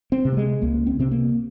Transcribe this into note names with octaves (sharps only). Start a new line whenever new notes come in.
C4
C3
A#3
G#3
C#2 A#3
C4
C3 C4
A#3